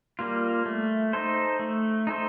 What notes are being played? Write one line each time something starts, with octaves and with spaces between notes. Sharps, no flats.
G3 A#3 F4
A3
D#4 A4 C5
A3
D#4 A4 C5